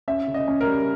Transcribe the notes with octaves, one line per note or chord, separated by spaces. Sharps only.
C#4 E5
C#3
D#5
C#4
A#4
G3